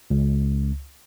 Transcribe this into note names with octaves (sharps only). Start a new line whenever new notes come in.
C#2